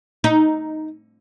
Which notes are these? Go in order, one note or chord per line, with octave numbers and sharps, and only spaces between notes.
D#4